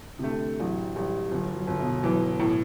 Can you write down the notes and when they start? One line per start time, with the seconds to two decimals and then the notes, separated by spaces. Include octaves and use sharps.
0.19 C3
0.23 D3 A3
0.60 A1 F#3
0.96 A1 G3
1.31 G1 F#3
1.55 F#3
1.67 G1
1.80 B2
2.03 E3 F#3
2.40 A2